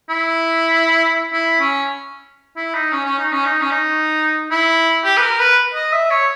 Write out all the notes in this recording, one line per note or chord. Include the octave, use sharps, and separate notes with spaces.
E4
E4
C#4
E4
D#4
C#4
C#4
D#4
C#4
D#4
C#4
D#4
E4
G4
B4
A#4
B4
D#5
E5
C#5